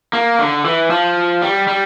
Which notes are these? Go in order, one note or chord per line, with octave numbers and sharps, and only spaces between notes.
A#3
D3
E3
F3
G3
G3